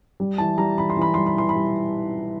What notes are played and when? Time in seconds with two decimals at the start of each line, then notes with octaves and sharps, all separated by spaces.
0.20 G3
0.38 E3 A5
0.58 G3 A#5
0.78 E3 B5
0.90 C6
0.97 E3 B5
1.14 G3 C6
1.26 B5
1.37 E3 C6
1.49 B5
1.56 G3